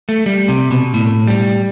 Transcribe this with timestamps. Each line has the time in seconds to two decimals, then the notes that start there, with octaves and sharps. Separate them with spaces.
0.09 A3
0.26 G3
0.48 C3
0.71 B2
0.94 A2
1.27 G3